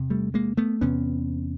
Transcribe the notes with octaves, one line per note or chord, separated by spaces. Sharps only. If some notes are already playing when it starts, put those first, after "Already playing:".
Already playing: E2 C3
G3 A3
G#3 A#3
A3 B3
E2 C3 B3 C#4